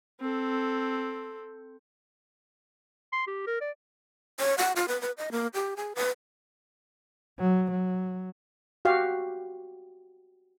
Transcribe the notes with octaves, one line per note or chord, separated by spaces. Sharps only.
C4 A4
C6
G4
A#4
D5
C#5
F#5
F4
B4
B4
D#5
A#3
G4
G#4
B4
F#3
F#3
F#4 G4 F5